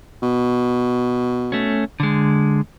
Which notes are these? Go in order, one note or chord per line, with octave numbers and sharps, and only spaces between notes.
B2
A3 C#4
D3 G#3